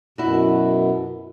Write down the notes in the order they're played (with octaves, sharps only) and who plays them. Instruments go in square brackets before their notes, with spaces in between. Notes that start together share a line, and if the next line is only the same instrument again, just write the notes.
[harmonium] F#2 B2 [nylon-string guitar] E4 F#4